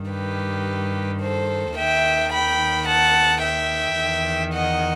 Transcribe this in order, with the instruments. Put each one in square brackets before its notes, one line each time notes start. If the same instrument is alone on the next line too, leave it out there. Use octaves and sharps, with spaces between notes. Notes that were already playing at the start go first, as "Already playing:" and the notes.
Already playing: [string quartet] G2 D#3
G4 B4
A4 C5
D#2 D#3 E5 G5
G5 B5
F#5 A5
E5 G5
E2 D#3
D#5 F#5